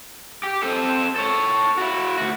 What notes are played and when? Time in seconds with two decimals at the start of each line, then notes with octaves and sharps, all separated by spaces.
0.43 G4
0.63 C4 A4
1.16 A4 C#5
1.78 E4 F#4
2.18 D2 F#4